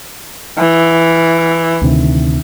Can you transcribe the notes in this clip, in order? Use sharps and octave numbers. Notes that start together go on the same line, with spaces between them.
E3
D2 C3 D#3